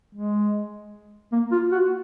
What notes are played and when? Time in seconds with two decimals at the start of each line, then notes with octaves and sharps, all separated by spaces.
0.15 G#3
1.32 A#3
1.52 F4
1.72 F#4